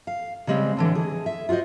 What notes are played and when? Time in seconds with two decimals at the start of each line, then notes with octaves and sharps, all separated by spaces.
0.07 F5
0.47 C#3 G3 G#3 A#3 C4
0.77 A2 D3 E3
0.95 G#4
1.26 E5
1.49 F4 F#4 G#4 C5 D#5